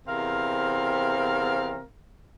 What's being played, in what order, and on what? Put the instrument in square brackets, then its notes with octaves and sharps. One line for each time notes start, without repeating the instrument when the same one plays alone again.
[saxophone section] E2 C3 C4 A#4 F5